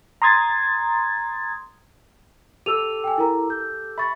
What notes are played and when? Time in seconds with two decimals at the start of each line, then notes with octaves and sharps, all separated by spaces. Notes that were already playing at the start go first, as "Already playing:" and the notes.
0.22 A#5 C6 D#6 G#6 A6
2.66 G4 A4 E6 D#7 F7
3.04 G5 G#5
3.18 E4 A#4 A#5
3.50 G6
3.98 E5 B5 C#6 A6